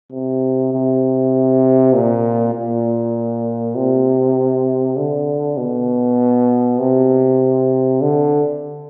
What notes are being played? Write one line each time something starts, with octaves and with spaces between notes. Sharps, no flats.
C3
C3
A#2
A#2
C3
D3
B2
C3
D3